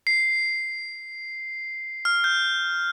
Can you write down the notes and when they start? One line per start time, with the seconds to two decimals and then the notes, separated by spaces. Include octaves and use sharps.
0.07 C7
2.05 F6
2.24 G6